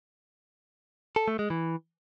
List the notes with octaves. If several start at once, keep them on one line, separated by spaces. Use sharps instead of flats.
A4
A3
G#3
E3